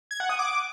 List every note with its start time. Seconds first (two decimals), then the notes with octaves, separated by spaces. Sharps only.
0.11 G#6
0.20 F#5
0.29 D#6
0.39 D6